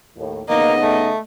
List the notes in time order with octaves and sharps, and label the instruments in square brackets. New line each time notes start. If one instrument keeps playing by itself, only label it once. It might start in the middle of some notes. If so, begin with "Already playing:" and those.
[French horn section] D#2 A2
[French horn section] C#3 B3 D#4 [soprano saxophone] A#3 [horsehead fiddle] D#5
[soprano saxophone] A3